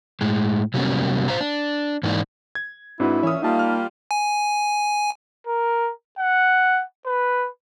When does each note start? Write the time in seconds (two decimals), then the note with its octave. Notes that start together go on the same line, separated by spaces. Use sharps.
0.21 A2 G#3
0.74 C3 F#3 G3 A#3 B3 C#4
1.28 C5 F5 A#5
1.41 D4
2.03 G#2 E3 A#3 D4 D#4 D5
2.55 G#6
3.00 G#2 C4 D4 E4 F#4 B4
3.23 A#2 E3 C#4 C#5 E5 D#6
3.42 G3 A#3 D#4 F4 F5 A5
3.59 F6
4.11 G#5
5.47 A#4
6.18 F#5
7.06 B4